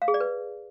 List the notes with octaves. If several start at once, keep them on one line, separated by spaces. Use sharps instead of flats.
F5
G#4
D5
B4